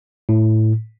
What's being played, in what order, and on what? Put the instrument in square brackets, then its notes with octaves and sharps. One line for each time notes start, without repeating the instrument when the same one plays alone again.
[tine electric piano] A2